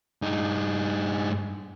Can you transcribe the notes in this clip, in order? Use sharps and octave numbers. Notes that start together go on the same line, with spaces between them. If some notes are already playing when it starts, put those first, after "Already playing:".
G2 D#4